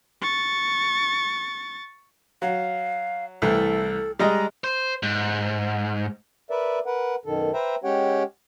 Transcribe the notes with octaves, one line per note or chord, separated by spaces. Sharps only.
C#6 A6
F#3 F5
C2 E3 A3 A4
G3 G#3 D#5 A#5
C5
G#2
A#4 B4 D5 E5
A#4 B4 F#5
F#2 B2 D#3 A4
B4 C5 E5 G5 A#5
G#3 C#4 G4 C#5 F#5 G5